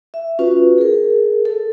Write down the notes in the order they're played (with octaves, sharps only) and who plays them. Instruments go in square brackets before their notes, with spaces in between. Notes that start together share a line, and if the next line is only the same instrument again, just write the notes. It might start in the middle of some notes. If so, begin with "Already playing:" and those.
[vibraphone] E5
C#4 F4 F#4 B4
G#4 A#4
A4